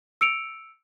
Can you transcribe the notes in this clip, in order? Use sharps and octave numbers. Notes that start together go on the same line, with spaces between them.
E6 C#7 D7 F7